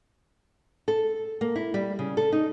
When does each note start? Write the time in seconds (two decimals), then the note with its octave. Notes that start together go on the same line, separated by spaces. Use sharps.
0.88 A4
1.41 A#3
1.56 E4
1.74 G3
1.99 C#3
2.17 A4
2.32 D#4